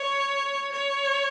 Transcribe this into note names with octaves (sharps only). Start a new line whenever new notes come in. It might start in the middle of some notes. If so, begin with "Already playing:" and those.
Already playing: C#5
C#5